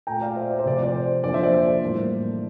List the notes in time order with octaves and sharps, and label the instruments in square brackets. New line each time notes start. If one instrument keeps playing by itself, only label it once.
[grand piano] A#2 A3 G5 A#5
D5 F5
C5 E5
D5
C5
C3 F3 A3 D5
D5
C5
F2 D3 F3 A#3 D5
C5 E5
D5
C5
A2 E3 G3 A#3